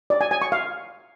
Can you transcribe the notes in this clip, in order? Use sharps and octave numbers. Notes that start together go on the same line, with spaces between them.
D5
G#5
G#5
C#6
F5